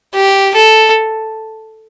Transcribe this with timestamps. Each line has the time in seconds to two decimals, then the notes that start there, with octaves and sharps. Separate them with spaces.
0.14 G4
0.54 A4